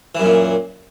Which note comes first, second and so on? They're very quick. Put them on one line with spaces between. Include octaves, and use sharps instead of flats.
E3 F#2 A#2